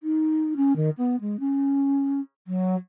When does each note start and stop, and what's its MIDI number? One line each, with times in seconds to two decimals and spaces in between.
0.03 0.53 63
0.56 0.76 61
0.76 0.90 51
0.97 1.19 59
1.20 1.39 56
1.39 2.20 61
2.47 2.76 54